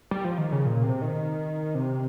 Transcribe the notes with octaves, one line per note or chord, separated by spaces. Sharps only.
G3
F3
D#3
C#3
A#2
C3
D#3
C3